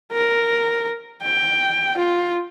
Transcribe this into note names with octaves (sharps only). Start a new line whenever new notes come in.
A#4
G5
F4